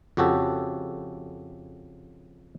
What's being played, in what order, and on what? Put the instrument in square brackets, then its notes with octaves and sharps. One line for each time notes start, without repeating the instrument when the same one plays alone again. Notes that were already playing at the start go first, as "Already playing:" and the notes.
[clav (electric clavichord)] F2 C#3 F#4 G4 A4